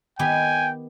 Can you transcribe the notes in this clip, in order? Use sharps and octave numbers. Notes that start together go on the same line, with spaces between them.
D#3 B3 G4 G5 G#5